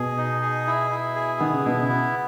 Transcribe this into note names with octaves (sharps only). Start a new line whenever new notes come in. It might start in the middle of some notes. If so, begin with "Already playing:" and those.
Already playing: B2 G#4
D#4
G#4
E4
E4
G#4
D#3 B3
C#3
B2 E4
C#3
B3